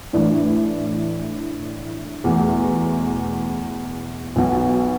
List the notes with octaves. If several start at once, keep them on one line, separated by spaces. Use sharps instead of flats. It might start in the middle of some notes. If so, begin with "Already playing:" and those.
A2 E3 D4
E2 B2 A3
B1 B2 F#3